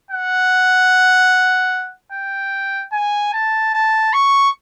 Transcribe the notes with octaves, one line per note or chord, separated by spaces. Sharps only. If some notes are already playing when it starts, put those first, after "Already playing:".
F#5
G5
G#5
A5
A5
C#6